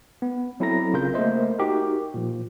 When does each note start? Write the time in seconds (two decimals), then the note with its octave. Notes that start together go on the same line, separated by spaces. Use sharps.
0.22 B3
0.60 F#3 C4 E4 A4 A#5 A#6
0.93 A#1 C#3 F4 A#4 G6
1.14 A3 A#3 A#4 C5 D#5 E5
1.59 D#4 F#4 G4 A#4
2.14 A#2 F3